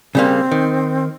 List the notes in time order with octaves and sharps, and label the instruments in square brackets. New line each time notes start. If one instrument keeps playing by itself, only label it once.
[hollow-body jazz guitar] C#3 G3 A#3 [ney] C4
[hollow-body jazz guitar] D#3